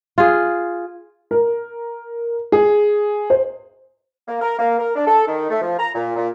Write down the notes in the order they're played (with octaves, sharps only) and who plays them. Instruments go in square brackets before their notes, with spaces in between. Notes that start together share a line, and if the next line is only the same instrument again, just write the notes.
[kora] F4 G#4
[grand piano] A#4
G#4
C5
[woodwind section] A#3
A#4
A#3
A#4
D4
A4
D#3
A3
F3
A#5
A#2
A#2